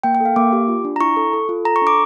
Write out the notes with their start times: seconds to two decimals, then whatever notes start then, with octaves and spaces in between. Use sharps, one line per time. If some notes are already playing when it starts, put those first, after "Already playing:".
0.03 A#3 G5
0.15 G5
0.20 A4
0.25 F5
0.36 A#3 D6
0.53 G4
0.68 F4
0.84 D4
0.96 A#5
1.01 E4 C#6
1.17 A4
1.33 A4
1.49 F4
1.65 A4 A#5
1.76 C#6
1.82 D4
1.87 D6